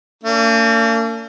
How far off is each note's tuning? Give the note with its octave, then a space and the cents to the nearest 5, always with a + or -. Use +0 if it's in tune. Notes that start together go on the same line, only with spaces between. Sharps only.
A#3 -45 D4 -40